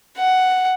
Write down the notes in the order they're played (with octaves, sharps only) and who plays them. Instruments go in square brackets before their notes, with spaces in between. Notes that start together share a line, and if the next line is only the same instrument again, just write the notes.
[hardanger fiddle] F#5